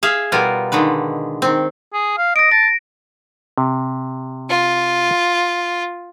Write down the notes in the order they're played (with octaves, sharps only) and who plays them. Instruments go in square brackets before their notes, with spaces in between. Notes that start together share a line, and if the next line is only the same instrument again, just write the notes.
[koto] G#4 E5 F5
B2 G3 F4 A#4
D3 D#3 G#3 B4
D#3 C4
[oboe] G#4
F5
[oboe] D#5 [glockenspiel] A#6 D7
[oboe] A5 [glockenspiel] A#6
[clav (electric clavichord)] C3
[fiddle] F4